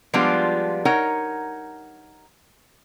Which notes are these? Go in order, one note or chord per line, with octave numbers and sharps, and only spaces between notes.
F3 G3 G#3 B3 D4 F4
D#4 A#4 C#5 F#5